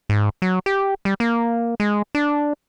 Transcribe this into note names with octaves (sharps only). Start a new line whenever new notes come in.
G#2
F#3
G4
G3
A#3
G#3
D4